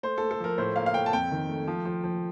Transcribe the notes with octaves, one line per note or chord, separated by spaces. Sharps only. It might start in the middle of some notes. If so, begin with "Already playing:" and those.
A3 C5
A3 A4
A4
F3 A#4
A2 C5
A#3 F5
F5
A2 G5
A5
F2 G5
D#3
A3
F3
F3
F3